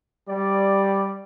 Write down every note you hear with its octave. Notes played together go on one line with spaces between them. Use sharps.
G3 D5